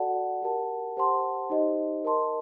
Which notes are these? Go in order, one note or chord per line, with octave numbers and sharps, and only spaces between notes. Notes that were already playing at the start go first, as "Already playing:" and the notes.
Already playing: F#4 A4 D5 F#5 A5
G4 A#4 F#5 A5
G4 C5 F#5 A5 C6
D#4 G4 C5 D#5
A#4 D#5 A5 C6